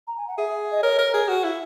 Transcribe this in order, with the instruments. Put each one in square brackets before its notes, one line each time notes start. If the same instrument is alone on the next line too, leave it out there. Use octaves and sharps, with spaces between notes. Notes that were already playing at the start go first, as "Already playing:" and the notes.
[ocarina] A#5
G#5
F#5
[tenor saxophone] G#4 [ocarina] E5
[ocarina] D#5
[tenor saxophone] A#4 [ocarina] C#5
[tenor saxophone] A#4
G#4
F#4
E4